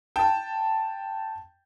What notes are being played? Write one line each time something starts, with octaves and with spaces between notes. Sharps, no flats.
G5 A5